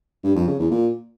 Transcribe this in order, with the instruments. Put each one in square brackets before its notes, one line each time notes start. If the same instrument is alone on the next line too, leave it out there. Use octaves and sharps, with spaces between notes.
[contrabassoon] G2
F2
C#3
E2
A#2